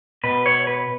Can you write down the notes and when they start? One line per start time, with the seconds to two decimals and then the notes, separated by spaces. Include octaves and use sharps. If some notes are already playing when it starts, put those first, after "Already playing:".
0.24 B2 B4
0.46 C#5
0.67 B4